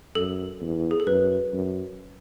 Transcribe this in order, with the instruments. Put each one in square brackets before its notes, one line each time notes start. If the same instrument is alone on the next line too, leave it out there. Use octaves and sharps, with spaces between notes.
[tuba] F#2 [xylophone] A4
[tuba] E2
[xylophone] G#4
A4
[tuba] F#2 [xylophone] B4
[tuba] F#2